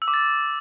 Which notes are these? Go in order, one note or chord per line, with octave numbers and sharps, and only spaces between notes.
E6
D6
A6